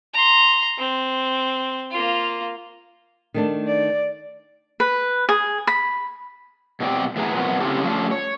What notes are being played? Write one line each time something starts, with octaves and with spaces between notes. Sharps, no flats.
A#5 C6
C4
A#3 F4
D#3 A3 D4
D5
B4
G#4
B5
B2 A3 C4 D5 G5
A2 E3 B3 G#4 B4 A#5
B2 F3 F#3 B3 C4 A#4
C#3 C4 E4 F4 G4 A4
F3 A3 C#4 D4
C#5